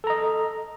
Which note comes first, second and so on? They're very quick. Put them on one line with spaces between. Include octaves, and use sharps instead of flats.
A4 A#5 D#5